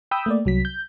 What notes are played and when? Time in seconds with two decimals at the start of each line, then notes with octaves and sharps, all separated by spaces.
0.11 G5 B5 D#6 E6 G6
0.26 A3 A#3 D5
0.45 C2 F#3 B6
0.65 G6